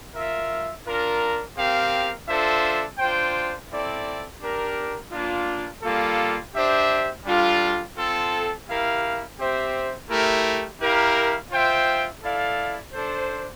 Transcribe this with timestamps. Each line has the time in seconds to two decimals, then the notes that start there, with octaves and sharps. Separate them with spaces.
0.15 F4 A#4 E5
0.86 D4 F4 A#4
1.56 C4 G4 A#4 F5
2.27 D4 F4 A4 C5 E5
2.98 D4 F4 C5 G5
3.70 C4 E4 A4 D5
4.41 D4 G4 A#4
5.12 A#3 D4 F4
5.82 G3 A#3 F4 A4
6.54 D4 G4 C5 E5
7.25 G3 D4 F4 A4
7.96 C4 F4 A4
8.67 E4 G4 A#4 F5
9.38 C4 G4 C5 E5
10.09 A3 E4 G4 A#4
10.79 E4 G4 A#4 F5
11.50 F4 C5 E5 G5
12.22 E4 A4 D5 F5
12.93 D4 A4 C5